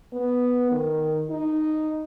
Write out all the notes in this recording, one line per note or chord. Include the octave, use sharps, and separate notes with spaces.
B3
D#3
D#4